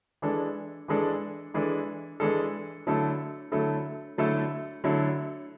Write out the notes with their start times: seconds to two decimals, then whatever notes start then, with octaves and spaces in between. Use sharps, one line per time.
0.22 E3 G#3 D4 A4
0.88 E3 G#3 D4 A4
1.54 E3 G#3 D4 A4
2.20 E3 G#3 D4 A4
2.87 D3 F#3 A3 E4 A4
3.51 D3 F#3 A3 E4 A4
4.18 D3 F#3 A3 E4 A4
4.84 D3 F#3 A3 E4 A4